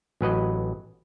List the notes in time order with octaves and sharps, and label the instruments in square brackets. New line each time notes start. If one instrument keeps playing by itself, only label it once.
[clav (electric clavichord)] A1 F#3 B4 D#5